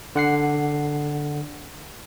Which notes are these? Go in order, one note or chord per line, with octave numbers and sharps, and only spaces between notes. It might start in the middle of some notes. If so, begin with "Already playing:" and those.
D3 F#5 C7